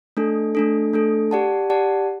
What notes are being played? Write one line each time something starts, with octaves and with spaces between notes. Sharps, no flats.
A3 D4 A4
A3 D4 A4
A3 D4 A4
G4 D5 F#5 A5
G4 D5 F#5 A5